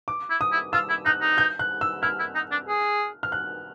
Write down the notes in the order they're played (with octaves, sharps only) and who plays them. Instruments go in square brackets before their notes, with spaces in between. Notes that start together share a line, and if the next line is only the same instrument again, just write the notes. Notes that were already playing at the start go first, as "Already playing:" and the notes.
[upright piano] D6
[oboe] E4
[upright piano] D#6
[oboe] E4
[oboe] F4 [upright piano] E6
[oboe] E4
[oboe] D#4 [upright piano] F#6
[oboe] D#4
[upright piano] G6
F#6
E6
[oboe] E4 [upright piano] F6
[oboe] E4
D#4
D4
G#4
[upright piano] F6
F#6